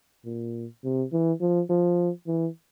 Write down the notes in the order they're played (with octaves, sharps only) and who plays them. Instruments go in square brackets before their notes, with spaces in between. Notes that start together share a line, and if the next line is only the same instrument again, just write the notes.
[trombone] A#2
C3
E3
F3
F3
E3